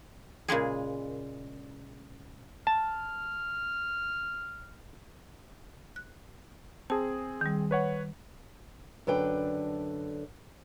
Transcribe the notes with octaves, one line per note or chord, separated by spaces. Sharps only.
A#2 C#3 G#3 G#4
A5 F6
F#6
C4 G#4 A5
D#3 G3
B4 C#5 F#5
F#2 D3 B4 G5